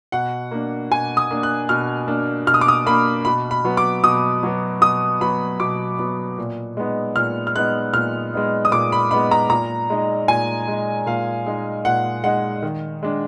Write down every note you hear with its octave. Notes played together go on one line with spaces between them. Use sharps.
B2 F#5
A#3 D4
B2 G#5
D#6
A#3 D4
F#6
B2 F6
A#3 D4
B2 F6
D#6
D6
D#6
A#3 D4 B5
B2 B5
B5
F#3 B3
D6
B2 D#6
F#3 B3
B2 D#6
F#3 B3 B5
B2 D6
F#3 B3
A#2
G#3 B3 D#4
A#2 F6
F6
G#3 B3 D#4 F#6
A#2 F6
G#3 B3 D#4
D#6
A#2 D6
B5
G#3 B3 D#4 B5
A#5
A#2 A#5
G#3 D#4
A#2 G#5
G#3 D#4
A#2 F5
G#3 D#4
A#2 F#5
G#3 D#4 F#5
D#3
G#3 D4